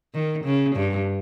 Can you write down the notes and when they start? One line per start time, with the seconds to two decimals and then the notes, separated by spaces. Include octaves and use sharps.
0.14 D#3
0.45 C#3
0.76 G2